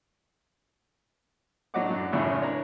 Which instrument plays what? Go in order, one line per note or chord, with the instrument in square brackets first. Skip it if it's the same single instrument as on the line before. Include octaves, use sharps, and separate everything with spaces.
[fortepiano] A2 F#3 D4 D#5 F#5 D6
F#2
G#1 F#2 A2 C#3 C#4 E5
D4 C#5 A#5